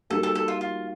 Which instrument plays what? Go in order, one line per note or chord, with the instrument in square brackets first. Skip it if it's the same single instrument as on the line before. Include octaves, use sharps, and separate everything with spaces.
[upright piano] G3 A#3 D#4 F#4 A#4 [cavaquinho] A4
[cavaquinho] A4
A4
F4
F4